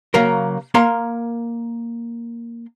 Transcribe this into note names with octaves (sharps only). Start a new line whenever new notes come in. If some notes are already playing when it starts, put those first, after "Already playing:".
C#3 F#3 A#3 A#4
A#3 A#4 A#5 C6